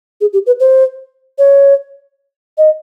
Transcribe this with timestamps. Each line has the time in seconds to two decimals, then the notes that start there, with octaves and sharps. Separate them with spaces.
0.21 G#4
0.33 G4
0.46 B4
0.60 C5
1.39 C#5
2.58 D#5